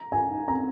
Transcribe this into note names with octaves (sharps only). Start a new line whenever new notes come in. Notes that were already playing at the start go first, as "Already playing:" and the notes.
Already playing: A#5
F4 G#5
D#4
C4 A#5